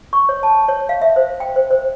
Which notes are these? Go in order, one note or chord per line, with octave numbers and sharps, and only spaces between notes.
C#6
C#5
A5
C#5
F5
E5
C5
G5
C5
C5